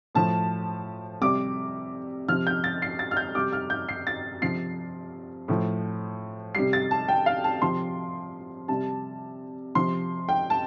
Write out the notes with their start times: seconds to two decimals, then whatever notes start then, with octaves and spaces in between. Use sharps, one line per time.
0.15 A2 F3 A5
1.21 C3 G3 D6
2.28 C3 F3 F6
2.47 G6
2.64 A6
2.82 C7
2.99 A6
3.11 F6
3.17 G6
3.35 C3 G3 D6
3.53 F6
3.70 G6
3.89 C7
4.07 A6
4.42 C3 F3 C7
5.48 A2 F3
6.55 C3 G3 C7
6.73 A6
6.91 A5
7.08 G5
7.26 F5
7.44 A5
7.62 C3 F3 C6
8.68 C3 G3 A5
9.75 C3 F3 C6
10.29 G5
10.50 A5